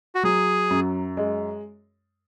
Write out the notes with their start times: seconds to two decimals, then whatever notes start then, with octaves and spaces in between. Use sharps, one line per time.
0.15 F#4
0.23 F#3 G#4
0.70 F#2
1.17 G#3